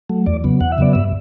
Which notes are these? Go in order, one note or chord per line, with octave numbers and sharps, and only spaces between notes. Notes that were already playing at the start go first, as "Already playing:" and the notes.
F#3 A3
E2 D5
C#3 F#3 B3
E2 F#5
E5
C#3 F#3 B3 D5
G2 E5